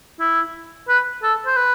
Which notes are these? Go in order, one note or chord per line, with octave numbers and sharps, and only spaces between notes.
E4
B4
A4
C5
B4